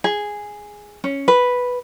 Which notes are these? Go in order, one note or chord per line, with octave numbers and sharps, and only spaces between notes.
G#4
C#4
B4